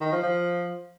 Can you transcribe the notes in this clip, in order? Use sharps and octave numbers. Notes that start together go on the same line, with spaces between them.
D#3
F3
F3